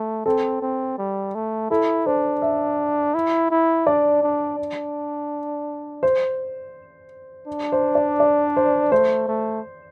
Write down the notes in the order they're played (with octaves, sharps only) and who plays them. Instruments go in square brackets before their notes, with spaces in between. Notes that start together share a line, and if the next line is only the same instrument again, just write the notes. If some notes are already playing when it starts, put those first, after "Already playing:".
Already playing: [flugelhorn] A3
[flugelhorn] C4 [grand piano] A4
[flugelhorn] C4
G3
A3
[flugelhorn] E4 [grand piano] A4
[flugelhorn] D4 [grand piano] C5
[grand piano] E5
[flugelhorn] E4
E4
[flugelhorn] D4 [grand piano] D5
[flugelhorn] D4
D4
[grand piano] C5
[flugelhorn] D4
[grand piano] C5
D5
D5
C5
[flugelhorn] A3 [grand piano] C5
[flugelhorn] A3